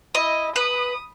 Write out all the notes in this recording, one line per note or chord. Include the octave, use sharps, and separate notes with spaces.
E4 D#5
B4 D#6